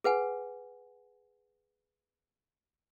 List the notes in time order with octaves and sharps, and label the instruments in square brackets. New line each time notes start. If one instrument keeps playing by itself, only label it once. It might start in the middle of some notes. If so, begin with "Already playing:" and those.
[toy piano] G#4 B4 F#5 G#5